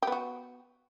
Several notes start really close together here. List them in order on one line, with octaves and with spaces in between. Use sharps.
G4 B3 F#4